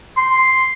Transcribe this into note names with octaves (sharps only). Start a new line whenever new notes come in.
C6